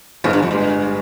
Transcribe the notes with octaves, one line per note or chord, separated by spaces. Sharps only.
G1 G#2
G2
F2
G2 G#3